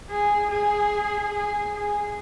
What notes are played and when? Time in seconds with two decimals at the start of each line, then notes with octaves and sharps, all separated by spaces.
0.10 G#4
0.51 G#4
1.34 G#4
1.75 G#4